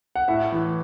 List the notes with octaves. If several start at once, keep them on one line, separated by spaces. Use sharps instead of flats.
F#5
A2 E5
E3